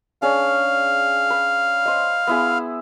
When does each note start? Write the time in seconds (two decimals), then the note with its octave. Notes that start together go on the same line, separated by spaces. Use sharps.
0.22 C#4 D4 G#4 F5
1.30 B4
1.86 C5 D#5
2.27 B3 E4 G#4